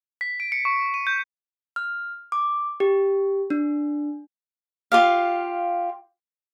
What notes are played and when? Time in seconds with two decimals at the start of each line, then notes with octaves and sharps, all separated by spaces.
0.21 B6
0.40 D7
0.52 C#7
0.65 C#6
0.94 D#7
1.07 G6
1.76 F6
2.32 D6
2.80 G4
3.50 D4
4.92 F4 G4 F5